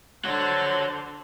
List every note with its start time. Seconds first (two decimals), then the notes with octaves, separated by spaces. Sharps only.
0.25 D3 C5 C#5 F#5